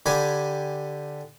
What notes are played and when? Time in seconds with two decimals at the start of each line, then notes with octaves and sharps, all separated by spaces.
0.06 D3 G4 G#5 B5 D6